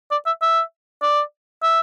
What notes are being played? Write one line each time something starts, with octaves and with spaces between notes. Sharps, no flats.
D5
E5
E5
D5
E5